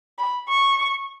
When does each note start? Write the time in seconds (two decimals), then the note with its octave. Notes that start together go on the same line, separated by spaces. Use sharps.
0.18 B5
0.49 C#6